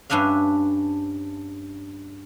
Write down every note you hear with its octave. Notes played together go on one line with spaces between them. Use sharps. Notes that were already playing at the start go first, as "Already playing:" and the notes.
G2 C#4 D4 E5 F5